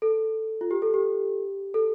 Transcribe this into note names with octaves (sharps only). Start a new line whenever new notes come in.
A4
F4
G4
A4
G4
A4